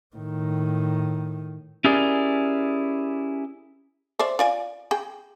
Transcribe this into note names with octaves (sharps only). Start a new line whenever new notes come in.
A2 D#3
C#4 E4 G4 G#4 A#4 D5
C5 D5 E5
F4 D5 G#5
G#4 G5